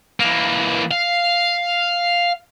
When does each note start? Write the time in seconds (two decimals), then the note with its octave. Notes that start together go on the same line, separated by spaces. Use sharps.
0.20 E3 A#3
0.91 F5